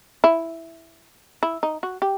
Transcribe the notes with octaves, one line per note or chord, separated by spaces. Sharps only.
E4
E4
D#4
F#4
G4